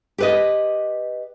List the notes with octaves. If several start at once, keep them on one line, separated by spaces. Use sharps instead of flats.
G4 B4 D#5